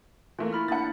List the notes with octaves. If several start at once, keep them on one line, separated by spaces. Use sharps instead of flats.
E3 A3 A#3 F4
E4 B5 F6
A#3 D4 F#5 A6